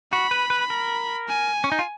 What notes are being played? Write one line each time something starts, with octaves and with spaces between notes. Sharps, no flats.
F#4 B5
B4
B4
A#4
G#5
C#4
D#4
F4